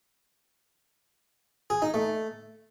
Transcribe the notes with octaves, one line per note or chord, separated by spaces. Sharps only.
G#4
D#4
A3